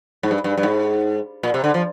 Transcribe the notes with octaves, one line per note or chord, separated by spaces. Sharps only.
G#2
G2
G2
G2
G#2
A#2
C3
D3
F3